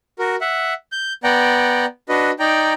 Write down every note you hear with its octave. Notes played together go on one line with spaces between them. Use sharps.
F#4 A#4
E5 F#5
G6
B3 D5 F#5 G5 A#5
D4 F#4 B4 D#5
D#4 D5 G5 A#5